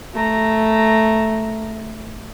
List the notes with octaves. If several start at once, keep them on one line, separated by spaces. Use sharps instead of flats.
A3 A#5